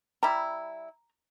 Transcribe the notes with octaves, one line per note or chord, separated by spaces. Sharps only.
G3 E4 A#5